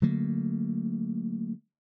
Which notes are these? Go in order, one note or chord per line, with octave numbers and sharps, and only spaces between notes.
D3 F#3 A3 A#3